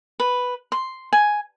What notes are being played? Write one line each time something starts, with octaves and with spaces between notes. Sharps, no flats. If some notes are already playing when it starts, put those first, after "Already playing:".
B4
C6
G#5